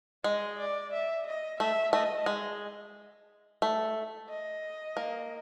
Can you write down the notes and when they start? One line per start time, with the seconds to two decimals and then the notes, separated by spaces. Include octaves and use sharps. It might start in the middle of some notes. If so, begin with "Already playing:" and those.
0.24 G#3 D#5
0.58 D5
0.93 E5
1.26 D#5
1.59 A3 E5
1.93 A3 D#5
2.26 G#3
3.62 A3
4.29 D#5
4.97 A#3